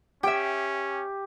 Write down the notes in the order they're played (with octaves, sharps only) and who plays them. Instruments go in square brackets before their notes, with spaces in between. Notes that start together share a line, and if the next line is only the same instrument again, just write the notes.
[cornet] C#4 [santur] G4 G#5 [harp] E5 G5